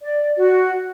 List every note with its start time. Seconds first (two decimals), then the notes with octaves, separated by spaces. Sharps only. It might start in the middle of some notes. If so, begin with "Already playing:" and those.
0.02 D5
0.38 F#4